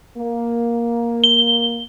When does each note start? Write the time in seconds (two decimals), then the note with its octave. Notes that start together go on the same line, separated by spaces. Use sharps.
0.17 A#3
1.24 G7